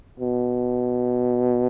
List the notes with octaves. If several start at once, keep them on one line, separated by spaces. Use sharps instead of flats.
B2